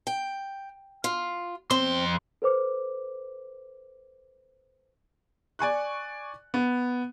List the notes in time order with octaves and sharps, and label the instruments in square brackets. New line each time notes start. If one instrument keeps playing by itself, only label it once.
[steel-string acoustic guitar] G5
F4
[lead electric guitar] F2 C6 [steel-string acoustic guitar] C4
[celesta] A4 B4 C5 D6
[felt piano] D5 G#5 C#6 F#6
B3